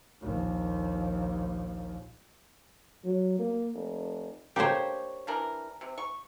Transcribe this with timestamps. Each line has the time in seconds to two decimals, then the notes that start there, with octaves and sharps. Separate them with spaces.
0.21 A#1 D#2
3.05 F#3
3.39 A#3
3.74 F1
4.56 A#3 D4 G4 C5 C#5
5.27 E3 D4 A#4
5.81 C3
5.98 C#6